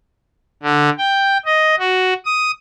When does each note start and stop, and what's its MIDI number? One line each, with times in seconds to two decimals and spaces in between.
0.63 0.90 50
0.98 1.38 79
1.45 1.75 75
1.79 2.14 66
2.25 2.51 87